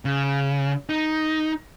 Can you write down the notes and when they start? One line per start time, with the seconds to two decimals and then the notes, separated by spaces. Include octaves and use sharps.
0.05 C#3
0.89 D#4